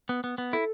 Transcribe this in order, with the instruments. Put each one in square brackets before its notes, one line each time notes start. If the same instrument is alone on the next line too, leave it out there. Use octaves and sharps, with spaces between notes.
[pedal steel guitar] B3
B3
B3
[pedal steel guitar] E4 [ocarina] A4